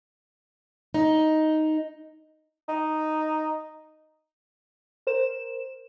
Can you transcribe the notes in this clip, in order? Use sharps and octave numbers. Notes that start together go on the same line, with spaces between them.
D#4
D#4
A#4 C5 E7